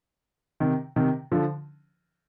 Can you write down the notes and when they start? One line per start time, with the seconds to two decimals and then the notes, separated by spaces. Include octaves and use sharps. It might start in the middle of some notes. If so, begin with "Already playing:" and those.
0.60 C3 D#3
0.96 C3 D#3
1.32 D3 F3